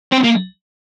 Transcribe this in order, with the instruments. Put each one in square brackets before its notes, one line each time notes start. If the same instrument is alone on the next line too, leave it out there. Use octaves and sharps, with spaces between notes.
[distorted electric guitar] C4
A#3